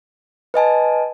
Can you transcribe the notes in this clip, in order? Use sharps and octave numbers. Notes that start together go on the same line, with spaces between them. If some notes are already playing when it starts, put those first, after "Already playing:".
B4 D#5 G#5 A5